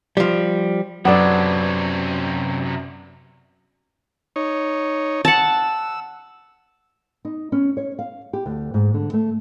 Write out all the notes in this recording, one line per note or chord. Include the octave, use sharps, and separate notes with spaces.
F3 G3
F#2 C3 F#3 B3 D4 A4
D#4 C#5
F#5 A5 E6
D#4
C#4
C#5
F5
G4
D2
G#2
D3
A3